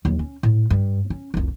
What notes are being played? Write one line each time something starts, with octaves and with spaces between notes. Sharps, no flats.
D#2 F#3
C#4
A2
G2
C#4
F1 C2